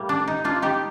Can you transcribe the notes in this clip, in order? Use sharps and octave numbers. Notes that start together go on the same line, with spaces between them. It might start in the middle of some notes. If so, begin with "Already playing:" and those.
Already playing: A2 G3 A#3
D4
D#4
D4 F4
D#4 G4